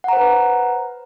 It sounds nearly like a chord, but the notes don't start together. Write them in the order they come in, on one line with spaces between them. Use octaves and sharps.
F#5 A#5 C5 B4